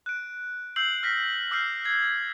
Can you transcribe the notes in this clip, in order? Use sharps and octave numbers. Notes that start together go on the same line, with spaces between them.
F#6 D7
E6 G6 C7 F#7
F6 A#6 B6
D6 E6 F6 G6 C7
G#6 C7